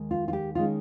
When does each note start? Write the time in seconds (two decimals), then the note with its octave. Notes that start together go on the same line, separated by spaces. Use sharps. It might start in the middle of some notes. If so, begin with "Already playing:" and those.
Already playing: D#2 D#3 G#3
0.11 F4
0.28 F4
0.33 G4
0.55 D#3 G#3 C#4 F4